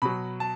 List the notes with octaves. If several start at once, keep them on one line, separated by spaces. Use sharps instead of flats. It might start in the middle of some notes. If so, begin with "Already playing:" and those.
B2 F#3 B5
A5